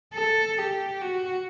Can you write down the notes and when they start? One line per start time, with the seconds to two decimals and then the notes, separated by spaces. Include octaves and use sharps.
0.14 A4
0.58 G4
1.02 F#4